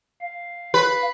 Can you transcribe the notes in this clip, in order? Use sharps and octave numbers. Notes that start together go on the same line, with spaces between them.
F5
B4